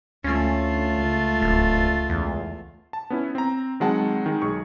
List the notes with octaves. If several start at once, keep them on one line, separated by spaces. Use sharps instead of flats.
D2 A3 C#4 F4
C#2
D1
E2
A5
B3 C#4 E4
C4 A#5
D#3 F#3 G#3 C4 F#5 A5
D#3 G#3
B1 G#4 C#6